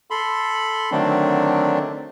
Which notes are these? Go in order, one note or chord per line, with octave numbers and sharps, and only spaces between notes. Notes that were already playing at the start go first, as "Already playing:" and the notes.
A4 B5 C6
D3 D#3 F#3 A3 C4 D4